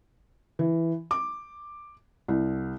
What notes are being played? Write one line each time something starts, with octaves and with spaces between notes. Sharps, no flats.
E3
D6
C2